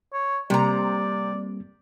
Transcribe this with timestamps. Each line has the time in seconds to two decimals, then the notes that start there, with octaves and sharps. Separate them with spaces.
0.13 C#5
0.50 C3 G3 A#3 C4 D5 A#5